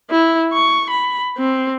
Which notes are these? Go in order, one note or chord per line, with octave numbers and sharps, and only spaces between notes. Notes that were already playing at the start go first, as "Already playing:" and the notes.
E4
C#6
B5
C4